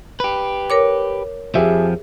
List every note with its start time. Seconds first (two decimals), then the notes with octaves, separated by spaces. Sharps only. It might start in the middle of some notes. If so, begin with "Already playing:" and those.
0.20 G4 B4
0.70 A#4 C#5 D6
1.55 F2 F3 G4 G#4 E5